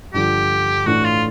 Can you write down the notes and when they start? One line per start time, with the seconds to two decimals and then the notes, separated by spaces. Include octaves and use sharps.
0.14 G2 D3 F3 G4
0.86 A2 E3 A3 D4 F#4
1.04 F4